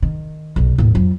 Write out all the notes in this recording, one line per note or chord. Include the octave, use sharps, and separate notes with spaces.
D#3
B1 F#2
D#2 A2
F2 F#3